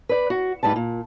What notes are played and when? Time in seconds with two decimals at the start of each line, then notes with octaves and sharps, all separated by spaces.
0.09 B4 D5
0.30 F#4
0.63 G#2 C#3 G3 B4 A5
0.76 A#2